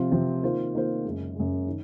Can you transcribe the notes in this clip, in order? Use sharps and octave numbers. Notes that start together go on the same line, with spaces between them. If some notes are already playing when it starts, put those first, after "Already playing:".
Already playing: C3 F3 C4 F4
C3 F3 C4 F4
D#3 A#3 F4 C5
D#3 A#3 F4 C5
F#2 C#3 G#3
F#2 C#3 G#3
D#3